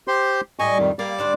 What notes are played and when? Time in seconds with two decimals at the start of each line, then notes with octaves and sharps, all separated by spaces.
0.08 G4 C5 C6
0.59 A2 G3 D#5 G#5 C#6
0.79 F2 D#3
0.99 G3 A#3 D5 D6
1.18 D2 D4 C5